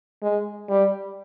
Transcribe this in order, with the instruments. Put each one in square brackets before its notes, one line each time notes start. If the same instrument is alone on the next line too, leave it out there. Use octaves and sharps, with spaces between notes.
[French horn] G#3
G3